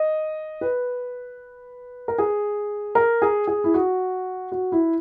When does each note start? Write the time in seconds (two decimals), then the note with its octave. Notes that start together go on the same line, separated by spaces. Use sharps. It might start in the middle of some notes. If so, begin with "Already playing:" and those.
Already playing: D#5
0.61 B4
2.08 A#4
2.18 G#4
2.95 A#4
3.22 G#4
3.47 G#4
3.64 E4
3.74 F#4
4.52 F#4
4.72 E4